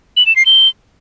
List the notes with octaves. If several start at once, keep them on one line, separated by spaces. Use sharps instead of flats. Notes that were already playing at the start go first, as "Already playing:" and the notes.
F#7
E7
C7
G7